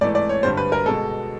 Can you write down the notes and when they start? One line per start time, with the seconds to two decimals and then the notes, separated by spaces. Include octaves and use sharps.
0.01 G#2 E3 A3 D5
0.15 D5
0.29 C#5
0.43 G2 D3 G3 C5
0.57 B4
0.72 A#4
0.86 B2 G#3 A4